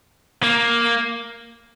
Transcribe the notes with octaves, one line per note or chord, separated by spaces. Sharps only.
A#3